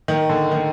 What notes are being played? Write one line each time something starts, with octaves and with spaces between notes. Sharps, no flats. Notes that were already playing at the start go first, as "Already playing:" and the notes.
D#3
D3
D#3